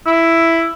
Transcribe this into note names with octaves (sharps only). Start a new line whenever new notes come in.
E4